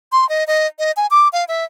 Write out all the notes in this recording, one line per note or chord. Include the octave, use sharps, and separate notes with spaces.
C6
D#5
D#5
D#5
G#5
D6
F5
E5